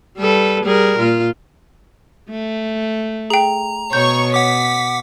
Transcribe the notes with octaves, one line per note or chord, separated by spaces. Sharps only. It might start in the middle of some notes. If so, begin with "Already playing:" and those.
G3 A4 B4
G3 G#4 A#4
A#2 F4
A3
G#4 G5 A#5
B2 C#5 C#6 G6
F#5 D6 B6